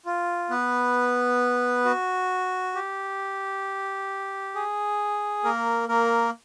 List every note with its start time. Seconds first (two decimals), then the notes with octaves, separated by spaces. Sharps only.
0.06 F4
0.50 B3 B4
1.85 F#4
2.75 G4
4.55 G#4
5.44 A#3 A#4
5.89 A#3 A#4